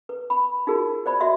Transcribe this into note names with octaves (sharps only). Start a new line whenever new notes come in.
B4
B5
D#4 F4 F#4 G#4 A#4
C5 D5 B5
F#4 D#5 E5 C6